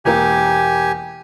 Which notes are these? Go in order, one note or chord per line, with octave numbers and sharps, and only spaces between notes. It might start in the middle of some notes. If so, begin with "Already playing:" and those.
E1 A#3 G4 G#5